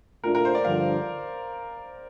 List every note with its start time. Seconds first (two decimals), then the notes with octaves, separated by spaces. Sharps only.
0.24 A#2 A3 D4 F4 A#4
0.35 A#4
0.45 C5
0.55 D5
0.65 G2 D3 F3 F5